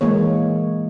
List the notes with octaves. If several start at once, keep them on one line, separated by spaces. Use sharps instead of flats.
E3 G#3 A#3 C#5